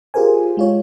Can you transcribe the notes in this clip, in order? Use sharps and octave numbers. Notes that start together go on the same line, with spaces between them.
F4 G4 G#4 A#4 C5 G#5
G#3 F4 C#5